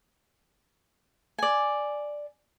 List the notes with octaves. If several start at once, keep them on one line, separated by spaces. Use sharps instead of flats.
D5 G#5